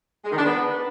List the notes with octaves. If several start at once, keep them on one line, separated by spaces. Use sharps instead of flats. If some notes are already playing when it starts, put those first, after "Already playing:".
G#3
D#3
D4
B3